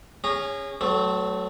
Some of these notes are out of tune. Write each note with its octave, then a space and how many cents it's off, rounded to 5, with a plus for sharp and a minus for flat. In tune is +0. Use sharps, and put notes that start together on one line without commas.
C#4 +0 G#4 -30 A#5 +0
F#3 +25 A3 +0 C4 -30